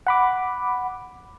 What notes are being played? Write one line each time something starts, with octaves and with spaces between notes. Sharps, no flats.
F#5 B5 D6